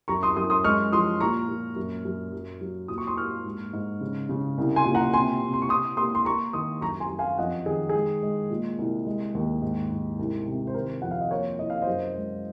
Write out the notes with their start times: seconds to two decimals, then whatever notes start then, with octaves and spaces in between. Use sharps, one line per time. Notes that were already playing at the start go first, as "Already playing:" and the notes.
0.08 F#2 A#5 C#6
0.23 C6 D#6
0.36 F#2 C6 D#6
0.50 C6 D#6
0.64 G#3 C#6 F6
0.92 F3 C6 D#6
1.20 A#2 A#5 C#6
1.49 A#2
1.76 F#2
2.05 F#2
2.33 F#3
2.61 F#3
2.88 A#2 D#6
2.98 C#6
3.07 C6 D#6
3.17 A#3 C#6 F6
3.45 G#2
3.73 G#2
4.01 C#3
4.29 C#3
4.58 C2
4.76 G#5 C6
4.85 A#2
4.95 F#5 A#5
5.13 C3 G#5 C6
5.42 C3
5.53 C6
5.62 C#6
5.69 C3 C6 D#6
5.97 A#3 C6 D#6
6.15 C6
6.25 A#3 A#5 C#6
6.53 D#3 C6 D#6
6.81 F#2 A#5 C#6
7.00 G#5 C6
7.10 F#2
7.19 F5 G#5
7.38 F2 D#5 F#5
7.66 D#3 G#4
7.89 G#3 G#4
8.23 G#3
8.50 A#2
8.78 C2
9.07 G#3
9.35 D#2
9.62 G#2
9.91 G#2
10.19 C2
10.46 C3
10.67 C5
10.74 D#3 A#4
11.02 F2 F#5
11.11 F5
11.21 D#5
11.31 A#3 A#4 C#5
11.59 C2 D#5
11.70 F5
11.82 C5 D#5
11.87 F#2
12.15 G#3